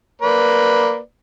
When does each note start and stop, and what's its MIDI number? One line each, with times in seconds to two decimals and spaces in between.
0.22 0.98 58
0.22 0.98 71
0.22 0.98 74